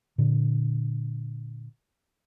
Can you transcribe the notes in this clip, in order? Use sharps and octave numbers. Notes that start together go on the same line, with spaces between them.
A#2 D3